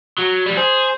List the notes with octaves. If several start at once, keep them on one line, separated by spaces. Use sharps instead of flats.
F#3
F#3 G3
G#4 C5